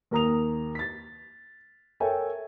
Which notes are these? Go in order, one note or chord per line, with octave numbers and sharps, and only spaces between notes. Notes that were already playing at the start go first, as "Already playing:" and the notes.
D#2 A#4 A#5 D#6 F7
A6 B6
A4 A#4 C#5 E5 G5 G#5